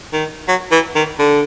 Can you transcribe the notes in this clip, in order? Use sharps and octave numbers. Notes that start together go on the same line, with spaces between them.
D#3
F#3
E3
D#3
D3